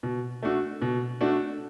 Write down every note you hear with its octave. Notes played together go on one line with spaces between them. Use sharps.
B2
A3 D4 F#4
B2
A3 D4 F#4